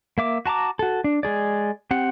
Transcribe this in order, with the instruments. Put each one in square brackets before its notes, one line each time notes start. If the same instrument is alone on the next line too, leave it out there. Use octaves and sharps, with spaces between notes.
[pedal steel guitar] A#3 E5 D6
F#4 A5 A#5 D6
F#4 A4
D4
G#3 G#4 D5
C4 G4 F#5